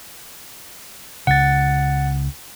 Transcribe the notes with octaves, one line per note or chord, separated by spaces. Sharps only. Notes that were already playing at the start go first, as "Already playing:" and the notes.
C#2 C#3 F#5 A6